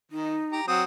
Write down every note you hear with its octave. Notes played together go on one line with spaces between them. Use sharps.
D#3 D#4
G4 A#5
F#3 C4 F#5 D#6